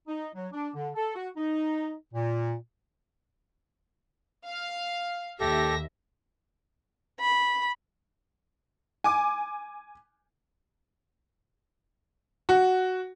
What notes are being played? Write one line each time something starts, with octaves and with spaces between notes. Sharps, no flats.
D#4
F#3
D4
D3
A4
F#4
D#4
A#2
F5
D#2 G4 A4 E5 A#6
B5
G#5 D6
F#4